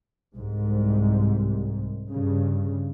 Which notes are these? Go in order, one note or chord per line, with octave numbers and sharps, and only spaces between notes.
C2 G#2
G2 C#3